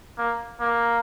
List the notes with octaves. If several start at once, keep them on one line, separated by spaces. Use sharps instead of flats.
A#3
A#3